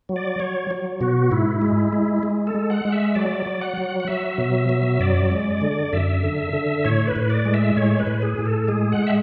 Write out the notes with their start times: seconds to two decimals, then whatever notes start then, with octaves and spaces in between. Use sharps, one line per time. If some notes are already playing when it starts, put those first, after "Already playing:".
0.09 F#3
0.16 D5
0.40 F#3 C#5
0.71 F#3
1.01 B2 F#4
1.31 G#2 E4
1.62 G#3
1.93 G#3
2.23 G#3
2.47 A4
2.55 G#3
2.70 F#5
2.85 G#3
2.92 E5
3.15 F#3 D5
3.46 F#3
3.61 F#5
3.77 F#3
4.00 F#5
4.07 F#3 E5
4.38 B2
4.69 F#3
5.00 F#2 D5
5.31 G#3
5.61 D3
5.93 F#2 E5
6.23 D3
6.53 D3
6.84 A2 C#5
7.07 B4
7.16 A2
7.30 D5
7.45 G#3
7.54 E5
7.77 A2 C#5
7.99 B4
8.07 A2
8.22 G#4
8.38 A2
8.46 A4
8.68 G#3 G#4
8.92 F#5
9.07 E5